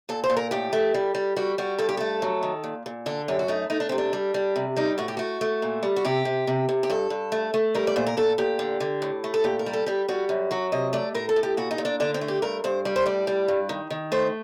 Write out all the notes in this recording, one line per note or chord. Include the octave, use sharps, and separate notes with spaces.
A#2 A4
C5
A#2
A#4
A2 G4
A3
G3
G3
G3 F#4
G3 F#4
G2 A4
G4
A3 A4
F#3
D#3
A#2
A#2
D3 A4
F#2 G4
F#4
A3 D#4
A3 D#4
D4
C3 C4
D4
G3
G3
C3
G3 D#4
A2 F#4
G4
A3 F#4
A3
A#2
G3
F#4
C3 G4
C3
C3
C3
G4
G2 A4
G2
A3
A3
G3 A#4
D5
A#2 C5
A#4
A#2 A4
A#2 G4
D3
D3
A2
A3
A4
A#2 G4
A#4
G3
A4
G3 G4
G3 F#4
F#2
F#3 F#4
C3 D#5
A3 D5
A2 A#4
A4
A2
G4
A#2 F#4
D#4
A#2
D4
D3 D4
C4
A3
G4
G2 A#4
G2 C5
G3
C5
A2 D5
G3
G2
D#3
D#3
A3 C5